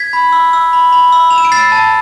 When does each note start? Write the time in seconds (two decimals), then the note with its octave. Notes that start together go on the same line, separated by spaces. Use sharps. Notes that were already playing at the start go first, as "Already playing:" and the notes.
Already playing: G#6 B6
0.13 B5
0.32 E6
0.53 E6
0.73 B5
0.93 B5
1.12 E6
1.30 E6 F7
1.38 E7
1.45 D7
1.52 E6 A6 C7
1.72 A5